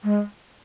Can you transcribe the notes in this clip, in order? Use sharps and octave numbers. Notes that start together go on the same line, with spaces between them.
G#3